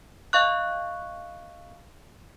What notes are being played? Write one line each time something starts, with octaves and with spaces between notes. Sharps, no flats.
D#5 F5 C#6 F#6